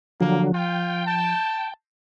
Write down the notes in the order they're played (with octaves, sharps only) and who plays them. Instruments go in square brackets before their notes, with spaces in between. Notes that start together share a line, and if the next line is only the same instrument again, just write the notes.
[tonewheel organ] D3 F#3 [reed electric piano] F3 [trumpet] A#3
[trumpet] F4 [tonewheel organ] G5
[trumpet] A5